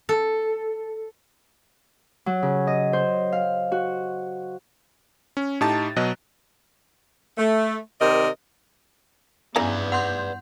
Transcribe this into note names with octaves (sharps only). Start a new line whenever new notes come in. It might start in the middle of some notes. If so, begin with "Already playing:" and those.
A4
F#3
C#3
D#5
C5
F5
F#4
C#4
A2 D#4 G4 A5 A6
B2 F#3 D#5 F#6
A3
C3 D#3 A#4 D5 D#5
G2 C#3 E3 B3 B4 D5 A#5
F#5 C6 G6